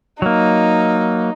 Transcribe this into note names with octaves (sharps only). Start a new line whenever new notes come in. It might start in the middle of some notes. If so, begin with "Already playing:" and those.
F#3 A#3 D#4